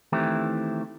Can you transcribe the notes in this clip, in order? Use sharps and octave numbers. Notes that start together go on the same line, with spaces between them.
D#3 E3 A3 C4 E4 G4